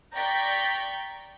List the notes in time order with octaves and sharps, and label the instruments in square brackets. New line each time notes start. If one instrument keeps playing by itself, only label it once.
[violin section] D5 G5 A#5 C#6 G6 B6